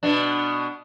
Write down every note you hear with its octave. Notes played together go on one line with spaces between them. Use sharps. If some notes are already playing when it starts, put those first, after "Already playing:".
B2 B3 D4